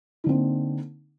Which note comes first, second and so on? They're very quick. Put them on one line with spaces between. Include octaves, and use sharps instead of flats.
D#4 D3 C4 A#3